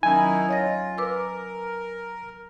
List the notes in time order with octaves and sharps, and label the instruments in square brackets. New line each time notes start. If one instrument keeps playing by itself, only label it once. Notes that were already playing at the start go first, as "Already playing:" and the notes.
[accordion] D#3 D#4 E4 [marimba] F#3 C#4 [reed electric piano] G#5
[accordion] F4 [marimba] C#5 D#5 A#6
[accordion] A#4 [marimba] B4 D6 E6